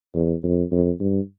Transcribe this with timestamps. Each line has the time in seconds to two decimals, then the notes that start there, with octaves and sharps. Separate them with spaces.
0.14 E2
0.43 F2
0.72 F2
1.00 G2